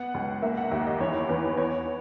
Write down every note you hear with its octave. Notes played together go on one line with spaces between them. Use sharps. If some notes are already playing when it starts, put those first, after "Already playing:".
Already playing: B3 F#5
C#2
A#3 E5
F#5
D#2 E5
D#5
E2 C#5
E2 B4
B3 C#5